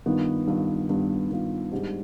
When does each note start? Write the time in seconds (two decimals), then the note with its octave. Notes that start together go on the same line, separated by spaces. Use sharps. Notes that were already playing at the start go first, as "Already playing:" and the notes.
0.06 G2 D#3 B3 F4
0.47 G2 D#3 B3 F4
0.89 G2 D#3 B3 F4
1.30 G2 D#3 B3 F4
1.71 G#2 G3 D4